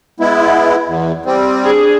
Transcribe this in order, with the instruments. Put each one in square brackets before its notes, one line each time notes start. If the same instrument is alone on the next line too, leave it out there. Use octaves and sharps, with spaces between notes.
[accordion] G#3 B3 E4
E2
G3 C4
[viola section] D4 G#4